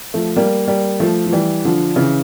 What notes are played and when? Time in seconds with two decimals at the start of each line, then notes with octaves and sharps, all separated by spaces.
0.14 F3 A3
0.36 G3 A#3
0.68 G3 A#3
1.00 F3 A3
1.26 F3
1.32 E3 G3
1.65 D3 F3
1.96 C#3 E3